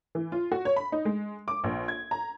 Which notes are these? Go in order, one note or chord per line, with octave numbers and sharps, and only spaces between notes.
E3
F4
F#4
C#5
B5
D#4
G#3
D6
A#1
G#6
A#5